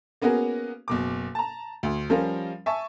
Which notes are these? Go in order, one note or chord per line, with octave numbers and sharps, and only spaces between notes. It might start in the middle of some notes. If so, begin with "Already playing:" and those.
A#3 B3 C#4 F#4 G#4 A#4
F#1 B2 D6
A5 A#5
D2
F3 G3 C#4 A#4 F5
E5 G#5 A5 C#6